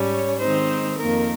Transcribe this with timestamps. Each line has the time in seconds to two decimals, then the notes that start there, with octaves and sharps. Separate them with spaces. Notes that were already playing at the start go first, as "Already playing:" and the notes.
Already playing: G#2 G3 C#4
0.12 C#5
0.40 D#3 G#3 C4 D#4 C5
0.98 F2 D#3 A#3 A#4